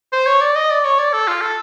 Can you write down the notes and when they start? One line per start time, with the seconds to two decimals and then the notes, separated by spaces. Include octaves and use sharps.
0.13 C5
0.27 C#5
0.41 D5
0.56 D#5
0.70 D5
0.85 C#5
0.99 D5
1.13 A4
1.28 F4
1.41 A4